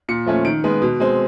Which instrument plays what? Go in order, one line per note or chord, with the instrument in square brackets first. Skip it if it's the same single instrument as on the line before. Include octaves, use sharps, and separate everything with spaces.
[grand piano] A#2 C#7
F3 A3 C#4
D#3 D7
G#3 B3
B2
G#3 C4